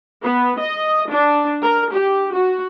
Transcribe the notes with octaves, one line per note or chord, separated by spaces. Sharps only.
B3
D#5
D4
A#4
G4
F#4